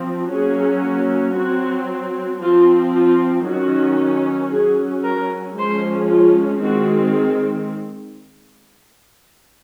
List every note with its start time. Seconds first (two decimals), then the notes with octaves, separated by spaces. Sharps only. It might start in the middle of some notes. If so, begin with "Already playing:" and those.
Already playing: F3 C4
0.30 F#3 A#3 C#4 G#4
1.35 F#3 C4 F#4
2.41 F3 C4 F4
2.95 F4
3.46 D#3 F#3 C#4 F#4
4.51 F#3 C#4 G#4
5.04 A#4
5.57 F3 G#3 C#4 C5
6.10 F4
6.62 D#3 G#3 C4 F#4